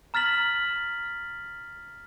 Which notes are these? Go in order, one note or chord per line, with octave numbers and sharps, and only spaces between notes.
A#5 F6 A6 B6 F#7